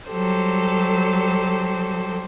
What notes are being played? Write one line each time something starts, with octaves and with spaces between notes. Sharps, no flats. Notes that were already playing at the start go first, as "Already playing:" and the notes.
F#3 G3 G4 A4 C5